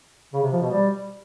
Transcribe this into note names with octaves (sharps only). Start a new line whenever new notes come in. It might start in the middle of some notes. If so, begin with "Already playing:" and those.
C#3
C3
F3
B2
G3